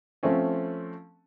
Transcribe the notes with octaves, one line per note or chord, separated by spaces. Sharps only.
F3 A3 C4 C#4